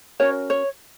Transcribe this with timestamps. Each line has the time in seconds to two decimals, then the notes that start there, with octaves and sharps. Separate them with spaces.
0.20 C#4 F#4 A#4 C#5
0.50 C#5